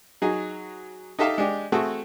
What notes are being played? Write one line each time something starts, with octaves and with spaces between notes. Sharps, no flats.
F#3 D#4 G#4
D#4 G4 A4 E5 F5 A5
G#3 D4 G4
A3 C4 F#4 G#4 A4